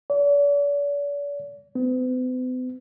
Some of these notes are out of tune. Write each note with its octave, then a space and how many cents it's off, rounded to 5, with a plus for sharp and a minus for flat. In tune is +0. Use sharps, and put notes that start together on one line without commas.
D5 -45
B3 +45